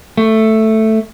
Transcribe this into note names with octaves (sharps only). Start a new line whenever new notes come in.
A3